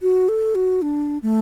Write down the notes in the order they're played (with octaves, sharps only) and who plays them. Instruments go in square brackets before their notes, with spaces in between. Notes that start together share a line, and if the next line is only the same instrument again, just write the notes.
[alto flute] F#4
A4
F#4
D4
A3